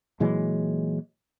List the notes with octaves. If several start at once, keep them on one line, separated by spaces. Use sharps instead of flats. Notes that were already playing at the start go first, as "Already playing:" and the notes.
A#2 E3 F#3 G#3